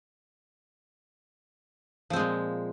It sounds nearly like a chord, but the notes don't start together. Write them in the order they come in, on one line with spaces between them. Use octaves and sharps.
F3 C4 G#3 A#2